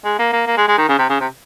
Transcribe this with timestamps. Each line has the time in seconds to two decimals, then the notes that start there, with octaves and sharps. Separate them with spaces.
0.04 G#3
0.19 A#3
0.33 A#3
0.47 A#3
0.57 G#3
0.68 G#3
0.78 D#3
0.88 C#3
0.98 C3
1.09 C#3
1.21 C3